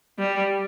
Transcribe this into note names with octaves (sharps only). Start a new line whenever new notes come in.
G3